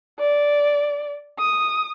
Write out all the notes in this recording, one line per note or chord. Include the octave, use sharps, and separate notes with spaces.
D5
D#6